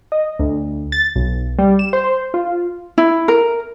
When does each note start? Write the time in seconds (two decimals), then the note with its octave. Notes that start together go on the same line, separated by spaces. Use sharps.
0.12 D#5
0.39 D2
0.92 A6
1.16 B1
1.59 G3
1.79 E7
1.93 C5
2.34 F4
2.98 E4
3.28 A#4